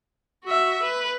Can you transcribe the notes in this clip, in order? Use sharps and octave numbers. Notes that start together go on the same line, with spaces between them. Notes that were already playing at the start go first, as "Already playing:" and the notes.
F#4 E5
B4